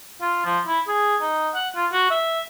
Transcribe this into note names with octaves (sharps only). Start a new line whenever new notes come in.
F4
F3
E4
G#4
D#4
F#5
F4
F#4
E5